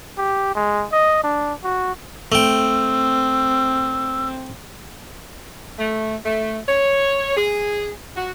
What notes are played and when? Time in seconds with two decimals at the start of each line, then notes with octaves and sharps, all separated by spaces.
0.18 G4
0.55 G#3
0.92 D#5
1.24 D4
1.63 F#4
2.32 A3 C4 G5 E6
5.79 A3
6.26 A3
6.69 C#5
7.37 G#4
8.16 F#4